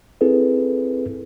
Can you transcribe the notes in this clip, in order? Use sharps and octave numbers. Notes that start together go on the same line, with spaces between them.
C4 E4 G#4 A4 B4